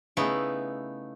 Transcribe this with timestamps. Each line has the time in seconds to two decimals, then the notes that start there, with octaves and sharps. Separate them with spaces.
0.17 C#3 A3 B3 D#4 E4